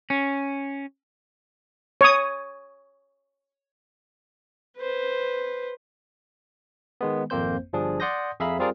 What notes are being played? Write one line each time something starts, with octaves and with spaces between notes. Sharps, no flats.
C#4
C#5 D#6
B4 C5
D#3 G#3 B3
G#1 F2 A#3 C4 C5 G6
G1 F3 G3 D4 G#4
D5 F#5 C6 D#6 G6 A#6
F2 G#4 E5 F5 A#5 B5
G3 C4 F4 G#4 A#4 D5